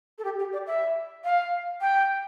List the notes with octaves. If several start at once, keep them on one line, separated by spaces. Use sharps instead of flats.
A4
G4
G4
D5
E5
F5
G5